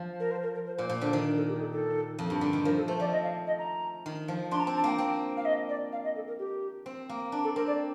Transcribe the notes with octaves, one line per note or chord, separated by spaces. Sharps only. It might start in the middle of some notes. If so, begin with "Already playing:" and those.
Already playing: F3
A#4
C5
A#4
A#4
C5
A#2 C5
A#2
D3 C5
D#3
A#4
A4
G4
A4
A4
F2
G2
D3
D#3
F3 A#4
A4
A3 C5
F3 D5
D#5
F5
D#5
A#5
D#3
F3
D4 C6
A#5
A5
C4
A5
A#3 G5
C4 G5
F5
D#5
D5
F5
D#5
A4
A#4
G4
C4
A#3
D4
A4
C4 A#4
D5